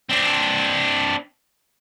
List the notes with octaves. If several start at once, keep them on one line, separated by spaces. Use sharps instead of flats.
C4 D4